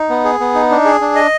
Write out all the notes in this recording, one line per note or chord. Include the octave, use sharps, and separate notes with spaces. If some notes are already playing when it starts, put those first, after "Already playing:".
Already playing: D#4
B3
G#4
B3
D#4
D4
G#4
D4
D#5